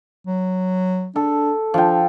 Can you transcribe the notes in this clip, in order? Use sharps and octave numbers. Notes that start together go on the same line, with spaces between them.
F#3
D4 A4
F3 D4 G5